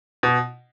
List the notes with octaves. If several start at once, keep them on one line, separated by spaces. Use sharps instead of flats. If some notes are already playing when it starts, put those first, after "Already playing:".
B2